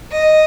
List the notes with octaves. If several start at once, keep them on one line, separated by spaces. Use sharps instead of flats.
D#5